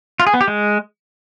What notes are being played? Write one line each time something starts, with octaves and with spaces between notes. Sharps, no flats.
F4
G#4
B3
G4
G#3